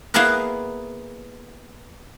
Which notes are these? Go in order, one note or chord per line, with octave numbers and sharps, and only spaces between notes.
A#3 B3 E4 G#4 A#4 B4